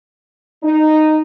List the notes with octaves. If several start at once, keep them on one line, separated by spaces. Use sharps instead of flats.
D#4